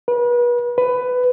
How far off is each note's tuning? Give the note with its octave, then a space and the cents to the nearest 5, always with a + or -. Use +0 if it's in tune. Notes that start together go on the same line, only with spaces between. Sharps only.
B4 -35
B4 +15